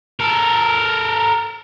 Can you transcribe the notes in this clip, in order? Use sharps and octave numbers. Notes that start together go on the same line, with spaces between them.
A4 A#4